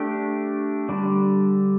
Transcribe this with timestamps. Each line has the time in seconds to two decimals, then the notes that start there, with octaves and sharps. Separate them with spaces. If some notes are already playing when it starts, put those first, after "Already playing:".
Already playing: A3 D4 G4
0.89 D3 G3 D4